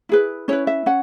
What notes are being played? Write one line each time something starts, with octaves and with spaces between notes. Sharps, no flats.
E4 G#4 B4
C#4 E4 B4 C#5
E5
C#4 F#5